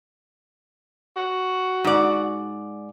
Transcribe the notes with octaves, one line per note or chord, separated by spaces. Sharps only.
F#4
G#2 D5